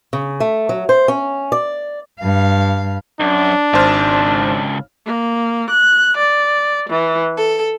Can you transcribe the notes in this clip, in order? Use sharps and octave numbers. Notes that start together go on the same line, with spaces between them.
C#3
A3
F#3
C5
C#4
D5
G2 F5
F#2 D4
G#1 C#2 C5 A5 F6
A#3
F#6
D5
E3
A4